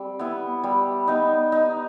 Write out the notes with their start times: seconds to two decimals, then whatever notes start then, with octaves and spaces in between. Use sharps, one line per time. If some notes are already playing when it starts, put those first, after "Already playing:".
Already playing: G3 C4
0.19 B3 E4
0.64 G3
1.08 B3 D#4
1.52 D#4